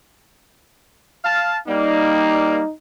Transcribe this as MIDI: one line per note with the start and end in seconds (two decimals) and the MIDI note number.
1.25 1.58 77
1.25 1.58 81
1.68 2.60 55
1.68 2.60 58
1.68 2.72 63